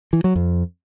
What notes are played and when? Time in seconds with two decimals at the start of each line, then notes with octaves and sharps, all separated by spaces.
0.13 E3
0.24 F#3
0.35 F2